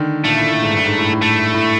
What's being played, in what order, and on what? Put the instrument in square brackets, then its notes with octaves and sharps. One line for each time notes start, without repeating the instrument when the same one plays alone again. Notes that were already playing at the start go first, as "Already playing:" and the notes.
Already playing: [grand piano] D3 D#3
[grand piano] A#2 [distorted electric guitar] A3
[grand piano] A2
A2
G#2
G2
G#2
A2
A2
[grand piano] A2 [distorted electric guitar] A3
[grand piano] A2